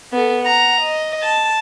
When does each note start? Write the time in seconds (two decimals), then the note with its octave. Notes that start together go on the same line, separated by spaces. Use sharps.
0.13 B3 A4
0.42 F#5 A#5
0.80 D#5
1.23 A5